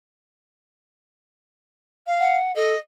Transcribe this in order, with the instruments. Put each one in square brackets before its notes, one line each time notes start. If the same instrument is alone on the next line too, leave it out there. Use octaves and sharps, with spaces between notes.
[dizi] F5
[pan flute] F#5
[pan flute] A4 [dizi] D#5